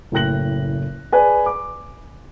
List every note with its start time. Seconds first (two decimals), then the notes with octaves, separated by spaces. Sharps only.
0.12 F#1 A2 G5 F#6 A#6 F#7
1.13 G#4 B4 D5 G#5
1.46 D6